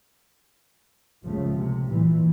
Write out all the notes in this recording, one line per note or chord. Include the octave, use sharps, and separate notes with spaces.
C#2 A#2 C#3 F3 A3
C3
A#2 E3